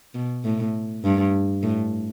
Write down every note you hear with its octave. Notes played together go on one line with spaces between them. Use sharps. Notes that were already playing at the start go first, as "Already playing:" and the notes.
B2
A2
G2
A2